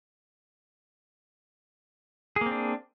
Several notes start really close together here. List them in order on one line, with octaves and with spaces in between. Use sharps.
G#4 A#3 C4 D4